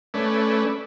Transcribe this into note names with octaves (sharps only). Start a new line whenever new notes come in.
A3 C#4 B4 D5